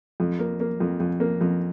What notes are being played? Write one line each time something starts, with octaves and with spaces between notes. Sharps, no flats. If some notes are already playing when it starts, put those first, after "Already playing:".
F2
A#3
A#3
F2
F2
A#3
F2